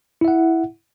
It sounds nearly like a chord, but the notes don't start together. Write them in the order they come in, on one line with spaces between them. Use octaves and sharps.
E4 E5 F#5